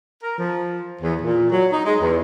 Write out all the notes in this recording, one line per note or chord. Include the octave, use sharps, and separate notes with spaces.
A#4
F3
E2
A#2
F#3
D#4
G#3
E2